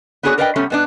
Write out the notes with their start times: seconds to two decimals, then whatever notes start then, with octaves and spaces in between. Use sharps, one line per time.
0.23 B3 D4 F#4 G#4 A#4 C#5
0.38 A#4 B4 D5 D#5 F5 G5
0.56 C3 G3 A3 B3 C#4
0.70 G#2 B3 D4